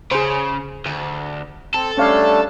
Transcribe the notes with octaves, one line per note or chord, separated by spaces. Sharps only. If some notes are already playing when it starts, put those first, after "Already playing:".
C#3 G#4 C5
D2
C4 A4
G3 A3 C#4 D4 C#5 F5